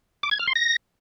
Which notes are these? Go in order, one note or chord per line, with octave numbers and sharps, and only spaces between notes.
D6
G#6
F6
C6
A#6